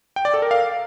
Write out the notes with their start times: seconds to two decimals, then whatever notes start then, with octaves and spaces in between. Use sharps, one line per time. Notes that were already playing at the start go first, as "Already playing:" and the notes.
0.16 G5
0.25 D5
0.34 A4
0.42 A#4
0.51 F5